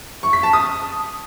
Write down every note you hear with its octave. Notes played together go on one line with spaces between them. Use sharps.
C#6
B6
A5
D#6